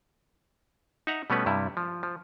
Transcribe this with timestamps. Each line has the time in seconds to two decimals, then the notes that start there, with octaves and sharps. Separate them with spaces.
1.07 D#4 E5 F#5 A#5
1.30 B2 G3 A3 B3 C#4 B4
1.46 G2 C3 G3 E4
1.77 F3
2.03 F3